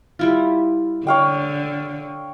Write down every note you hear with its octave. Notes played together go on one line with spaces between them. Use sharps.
G3 E4 F4
D3 C#5 F5 G5